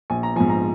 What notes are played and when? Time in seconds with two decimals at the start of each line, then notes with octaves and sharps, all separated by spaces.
0.10 A#1 G#5
0.23 A#5
0.36 F3 G#5
0.40 G#2
0.50 A#5